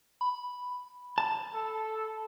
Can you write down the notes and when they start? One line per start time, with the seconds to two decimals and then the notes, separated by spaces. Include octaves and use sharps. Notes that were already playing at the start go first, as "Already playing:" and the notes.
0.21 B5
1.18 A5
1.55 A4